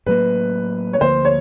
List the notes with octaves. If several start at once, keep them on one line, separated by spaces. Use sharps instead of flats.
A2 F#3 A#3 B4
C#5
D2 D3 F3 A#3 C5
C#5